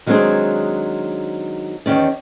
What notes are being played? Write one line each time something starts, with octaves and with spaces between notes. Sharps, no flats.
D#3 F#3 G#3 C4 D4 G#4
E2 D#3 C#4 D5